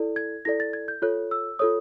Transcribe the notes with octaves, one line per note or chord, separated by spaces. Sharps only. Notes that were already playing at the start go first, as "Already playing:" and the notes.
Already playing: E4 A4 D5
G#6
E4 A4 D5 A#6
A6
G#6
G6
F4 A4 C#5 F#6
E6
F4 A4 C#5 D#6